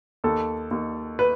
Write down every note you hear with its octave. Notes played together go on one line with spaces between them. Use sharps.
D#2 A4
D#2
B4